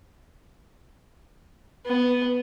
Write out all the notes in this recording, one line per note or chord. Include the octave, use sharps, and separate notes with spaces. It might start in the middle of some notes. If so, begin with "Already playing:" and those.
B3